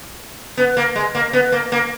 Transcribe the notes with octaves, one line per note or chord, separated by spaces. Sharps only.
B3
A#3
G#3
A#3
B3
A#3
A#3